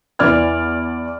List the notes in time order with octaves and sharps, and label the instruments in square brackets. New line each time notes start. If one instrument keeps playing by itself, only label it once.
[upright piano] E2 E3 D5 F6 G#6